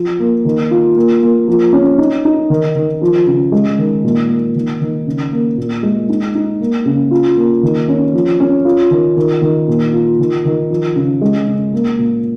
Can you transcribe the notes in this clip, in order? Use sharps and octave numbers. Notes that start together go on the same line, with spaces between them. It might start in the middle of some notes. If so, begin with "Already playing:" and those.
Already playing: F3
A#3
D#3
F4
A#3
A#3
F3
C#4
D#4
D#4
D#3
D#3
F3
C#3
G#3
D#3
A#2
A#3
D#3
D#3
C#3
A#3
A#2
G#3
D#4
D#4
A#3
C#3
F4
A#3
D#3
C#4
F3
C#4
F4
D#3
D#3
D#3
A#2
F4
D#3
D#3
F3
C#3
G#3
C#3
A#3
A#2